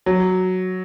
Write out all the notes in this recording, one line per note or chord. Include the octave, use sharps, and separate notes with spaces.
F#3